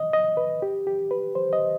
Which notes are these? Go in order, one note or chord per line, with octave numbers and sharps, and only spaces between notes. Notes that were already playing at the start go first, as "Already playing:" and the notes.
Already playing: D#5
D#5
B4
G4
G4
B4
C5
D#5